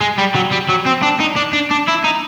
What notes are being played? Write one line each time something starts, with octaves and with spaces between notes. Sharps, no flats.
G#3
G3
F#3
G3
F#3
C4
D4
D#4
D4
D4
D4
E4
D#4